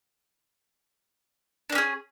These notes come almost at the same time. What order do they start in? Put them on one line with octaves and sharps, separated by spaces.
D4 A#3 C#4 G#4